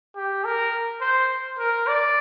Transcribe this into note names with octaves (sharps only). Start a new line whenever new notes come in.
G4
A#4
C5
A#4
D5